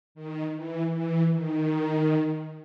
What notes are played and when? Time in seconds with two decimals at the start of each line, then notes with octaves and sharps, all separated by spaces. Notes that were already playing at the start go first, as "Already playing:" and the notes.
0.15 D#3
0.55 E3
0.93 E3
1.32 D#3